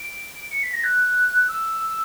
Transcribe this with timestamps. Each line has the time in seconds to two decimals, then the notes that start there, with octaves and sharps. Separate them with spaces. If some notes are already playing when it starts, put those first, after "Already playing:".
Already playing: D7
0.51 C#7
0.63 B6
0.73 A#6
0.84 F#6
1.48 E6